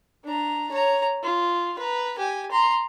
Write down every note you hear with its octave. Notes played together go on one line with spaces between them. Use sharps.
D4 A#5
C#5 A#5
F4
B4 A#5
G4 G#5
A#5 C6